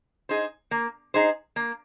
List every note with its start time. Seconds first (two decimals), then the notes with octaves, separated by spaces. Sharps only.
0.29 D#4 G#4 C5
0.71 A#3
1.14 D#4 G#4 C5
1.56 A#3